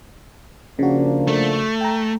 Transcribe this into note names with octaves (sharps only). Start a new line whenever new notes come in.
C#3 F3 A#3 D4 F#4
A3
G5 A#5